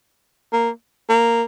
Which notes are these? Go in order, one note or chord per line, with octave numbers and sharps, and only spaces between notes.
A#3
A#3